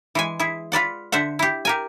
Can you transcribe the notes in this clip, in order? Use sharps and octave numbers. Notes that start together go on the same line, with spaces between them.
E3 G#3 G#5
E4 G#4
F4 B4 D5 F#5
D3 C5 E5 F#5
E4 G4
G4 A#4 G#5